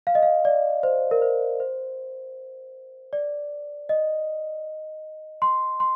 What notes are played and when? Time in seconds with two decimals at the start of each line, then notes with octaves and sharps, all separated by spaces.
0.07 F5
0.15 D#5
0.23 F5
0.45 D5
0.83 C5
1.11 A#4
1.22 C5
1.60 C5
3.13 D5
3.89 D#5
5.42 C6
5.80 C6